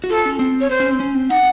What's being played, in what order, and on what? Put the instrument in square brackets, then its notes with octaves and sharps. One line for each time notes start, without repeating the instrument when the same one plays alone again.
[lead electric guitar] F#4
[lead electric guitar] F4 [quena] A4
[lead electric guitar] C#4
C4
[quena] C#5
C5
[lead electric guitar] C#4
C4
C#4
C4
[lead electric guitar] D#4 [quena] F#5